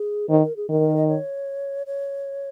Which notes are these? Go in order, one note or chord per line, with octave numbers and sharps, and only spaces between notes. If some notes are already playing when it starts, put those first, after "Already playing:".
Already playing: G#4
D#3 C5
A#4
G#4
D#3 A#4
D#5
C#5
C#5